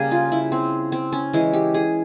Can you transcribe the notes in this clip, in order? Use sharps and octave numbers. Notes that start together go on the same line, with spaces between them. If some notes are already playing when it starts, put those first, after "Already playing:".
Already playing: C#3 G3 A#3 G#4
F4
E4
C4
C4
C#4
E3 G#3 E4
G4
G#4